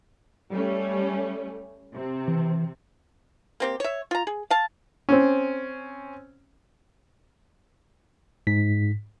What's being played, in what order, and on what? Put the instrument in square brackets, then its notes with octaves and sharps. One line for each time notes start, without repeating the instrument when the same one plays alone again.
[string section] G3 A3 C#4
C3 C4
[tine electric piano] E3
[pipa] A#3 C4 G4
C#5 E5
F4 A#5
G#4
F5 A5
[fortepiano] C4 C#4
[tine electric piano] G#2 B6